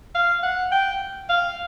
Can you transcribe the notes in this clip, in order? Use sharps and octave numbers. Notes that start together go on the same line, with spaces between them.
F5
F#5
G5
F5